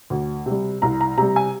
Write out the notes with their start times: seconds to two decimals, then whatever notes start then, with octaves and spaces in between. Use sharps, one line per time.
0.10 D2
0.46 C3 G3
0.82 C2 A#5
1.01 A#5
1.17 C3 G3 A#5
1.36 G#5